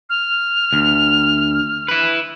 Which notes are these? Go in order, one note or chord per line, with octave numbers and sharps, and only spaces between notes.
F6
D2
E4 B4